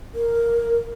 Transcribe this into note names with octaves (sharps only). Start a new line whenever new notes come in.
A#4